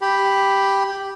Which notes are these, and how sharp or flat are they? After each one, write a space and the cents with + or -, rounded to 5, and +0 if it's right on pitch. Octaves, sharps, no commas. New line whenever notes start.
G4 +0 B5 +0